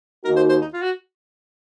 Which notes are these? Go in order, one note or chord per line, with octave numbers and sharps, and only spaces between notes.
D#2 D#3 A#3 D#4 F#4 A#4
C5
C5
D#4
F4
F#4